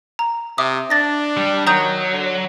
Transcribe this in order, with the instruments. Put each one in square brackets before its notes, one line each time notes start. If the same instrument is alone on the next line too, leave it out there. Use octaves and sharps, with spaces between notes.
[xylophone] A#5
[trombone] C3 [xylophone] E5 D6 D#6
[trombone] D4 [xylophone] A6 A#6
[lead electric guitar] G3
[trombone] D#3 [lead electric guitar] F#3 [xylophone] A#5 D#6 G6
[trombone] D3